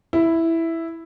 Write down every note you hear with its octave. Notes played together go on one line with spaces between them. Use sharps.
E4